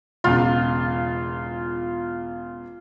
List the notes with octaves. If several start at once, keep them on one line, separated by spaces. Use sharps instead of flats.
E1 E2 C#3 F4